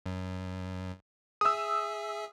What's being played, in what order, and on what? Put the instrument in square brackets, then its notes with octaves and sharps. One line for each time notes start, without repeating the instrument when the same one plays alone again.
[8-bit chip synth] F#2
[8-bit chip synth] G#4 E5 [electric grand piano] D#6 E6